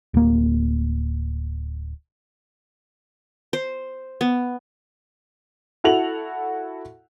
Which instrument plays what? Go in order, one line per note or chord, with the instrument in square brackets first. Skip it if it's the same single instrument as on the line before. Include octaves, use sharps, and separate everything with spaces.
[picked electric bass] D1 A#3
[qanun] C5
B3
[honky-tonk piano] E4 F#4 A4 F7 F#7